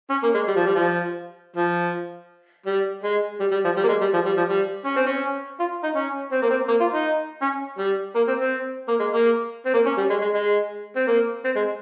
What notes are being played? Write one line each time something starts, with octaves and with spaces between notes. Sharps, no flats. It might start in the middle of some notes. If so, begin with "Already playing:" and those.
C#4
A#3
G#3
G3
F3
G3
F3
F3
G3
G#3
G3
G3
F3
G3
A#3
G#3
G3
F3
G3
F3
G3
C#4
C4
C#4
F4
D#4
C#4
C4
A#3
C4
A#3
F4
D#4
C#4
G3
A#3
C4
C4
A#3
G#3
A#3
C4
A#3
C#4
G3
G#3
G#3
G#3
C4
A#3
C4
G#3